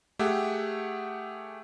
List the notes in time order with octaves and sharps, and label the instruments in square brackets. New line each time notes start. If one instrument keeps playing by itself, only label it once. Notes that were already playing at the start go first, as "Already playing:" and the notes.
[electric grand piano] A3 G4 G#4 E5 F#5